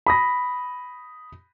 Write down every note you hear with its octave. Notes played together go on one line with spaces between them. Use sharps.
B5 D#6 A#6